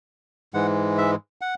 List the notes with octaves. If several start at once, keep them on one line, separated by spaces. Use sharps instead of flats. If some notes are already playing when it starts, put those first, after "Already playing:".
G#2 E3 G#3 F#5
E5
F#5